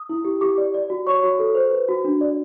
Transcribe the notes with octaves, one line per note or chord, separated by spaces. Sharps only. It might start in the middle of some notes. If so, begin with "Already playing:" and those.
Already playing: D#6
E4
G4
G4 D6
D5
D5
F#4
C#5 C#6
F#4
A4
C5
B4
F#4
D4
D5